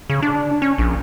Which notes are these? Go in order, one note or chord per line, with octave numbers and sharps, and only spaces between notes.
C#3
D4
C#4
A#1